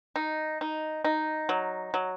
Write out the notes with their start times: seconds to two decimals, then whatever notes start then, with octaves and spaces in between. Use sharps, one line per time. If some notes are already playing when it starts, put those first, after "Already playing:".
0.16 D#4
0.61 D#4
1.04 D#4
1.49 F#3
1.94 F#3